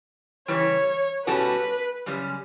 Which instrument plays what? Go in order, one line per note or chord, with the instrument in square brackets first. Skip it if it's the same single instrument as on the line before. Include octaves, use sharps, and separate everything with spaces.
[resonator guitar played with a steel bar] C#3 E3 G3 [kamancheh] C#5
[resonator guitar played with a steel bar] B2 G3 C#4 F#4 A4 [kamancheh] B4
[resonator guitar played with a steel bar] F#2 C#3 G3 C#4